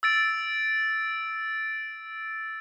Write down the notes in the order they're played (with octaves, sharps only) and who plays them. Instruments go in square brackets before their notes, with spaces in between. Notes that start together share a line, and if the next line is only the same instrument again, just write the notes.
[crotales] E6 A6 D7